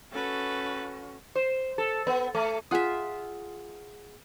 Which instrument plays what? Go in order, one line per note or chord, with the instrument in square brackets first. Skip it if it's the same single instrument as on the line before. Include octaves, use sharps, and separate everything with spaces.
[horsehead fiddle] C#4 F#4 [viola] A4 B4
[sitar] C5
A4
B3
A3
[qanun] F4 E5 [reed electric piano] G#4 F#5 D#6